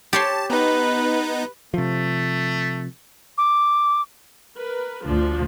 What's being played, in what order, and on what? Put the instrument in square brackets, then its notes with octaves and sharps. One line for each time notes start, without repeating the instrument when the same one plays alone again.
[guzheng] G4 C#5 C6 [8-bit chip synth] A5
[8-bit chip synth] B3 D#4 [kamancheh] B4
[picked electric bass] C3 F3 [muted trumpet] A3
[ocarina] D6
[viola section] A#4 B4
[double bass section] D2 [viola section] F3 D4